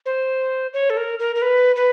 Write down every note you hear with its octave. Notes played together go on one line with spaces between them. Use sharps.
C5
C#5
A4
A#4
A#4
A#4
B4
B4